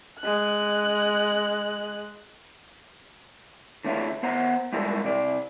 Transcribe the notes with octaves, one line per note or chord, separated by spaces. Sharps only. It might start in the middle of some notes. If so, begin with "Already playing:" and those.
G#3 F#6
D3 A3 C#4 E4 F4
B3 C5 F#5 A#5
G3 G#3 E4 F4 A4 A#4
C3 D5